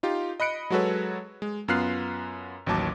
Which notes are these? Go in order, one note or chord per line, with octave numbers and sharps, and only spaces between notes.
D#4 F4 G4
D#5 B5 F#6 C#7 D7
F#3 G#3 F#4 A4 B4 C#5
G#3
F#2 B3 F4 F6 F#6 C7
A1 D#2 F#3 A5 D6